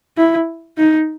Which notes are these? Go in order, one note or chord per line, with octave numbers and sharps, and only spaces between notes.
E4
D#4